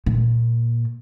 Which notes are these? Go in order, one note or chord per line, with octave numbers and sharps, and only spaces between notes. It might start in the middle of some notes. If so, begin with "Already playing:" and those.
A#2